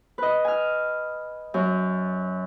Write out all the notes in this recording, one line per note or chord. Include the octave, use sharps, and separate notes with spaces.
B4 D#5
G#5 F6
F#2